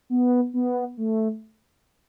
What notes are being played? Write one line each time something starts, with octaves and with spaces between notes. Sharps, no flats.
B3
B3
A3